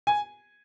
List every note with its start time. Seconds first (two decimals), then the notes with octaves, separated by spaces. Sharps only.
0.07 G#5